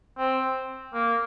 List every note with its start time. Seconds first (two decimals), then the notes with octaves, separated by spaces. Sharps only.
0.18 C4
0.93 A#3